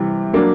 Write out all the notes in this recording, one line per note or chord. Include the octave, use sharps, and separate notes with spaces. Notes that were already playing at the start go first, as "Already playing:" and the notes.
Already playing: C3 E3 G3
F#3 A#3 D4